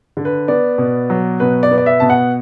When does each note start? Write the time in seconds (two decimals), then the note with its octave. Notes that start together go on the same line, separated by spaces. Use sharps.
0.17 D3
0.25 B4
0.48 B3 D5
0.78 B2
1.10 F#3
1.40 B2 B4
1.63 D5
1.71 B3
1.78 D5
1.86 E5
2.00 B2 A5
2.10 F#5